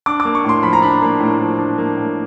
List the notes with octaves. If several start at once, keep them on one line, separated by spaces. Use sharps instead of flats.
D4 D6
D6
A#3
C#6
A2 C6
F3 B5
A#5
D4 B5
A#3
A2
F3
D4
A#3
A2